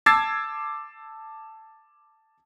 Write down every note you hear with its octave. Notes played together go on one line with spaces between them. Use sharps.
A5 D6 E6 G#6 A6 C7